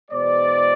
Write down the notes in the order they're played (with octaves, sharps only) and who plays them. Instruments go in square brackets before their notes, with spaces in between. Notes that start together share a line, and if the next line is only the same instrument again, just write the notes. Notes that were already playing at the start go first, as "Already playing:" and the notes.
[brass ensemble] E2 B2 G#3 B3 C5 D5